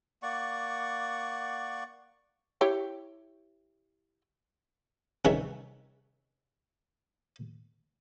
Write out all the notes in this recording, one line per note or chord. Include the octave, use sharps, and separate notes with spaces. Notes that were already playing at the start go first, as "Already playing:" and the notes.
A#3 D5 F#5 C#6
E4 G4 C#5
C2 D#3 E3 C#4 G#4 E5